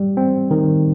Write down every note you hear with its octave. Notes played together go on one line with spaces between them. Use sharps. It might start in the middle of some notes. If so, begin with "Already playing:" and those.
Already playing: G3
C4
D#3